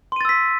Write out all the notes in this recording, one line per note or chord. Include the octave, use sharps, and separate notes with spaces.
C6 E6 A6 B6 D#7